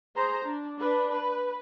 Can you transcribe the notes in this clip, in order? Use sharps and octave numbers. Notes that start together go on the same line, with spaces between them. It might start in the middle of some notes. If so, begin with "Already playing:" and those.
G#4 C5 A#5
D4
D4 B4
B4